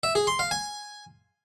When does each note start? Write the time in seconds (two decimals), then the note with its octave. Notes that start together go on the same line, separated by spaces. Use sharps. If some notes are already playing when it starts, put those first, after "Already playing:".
0.03 E5
0.15 G#4
0.27 C6
0.39 F5
0.51 G#5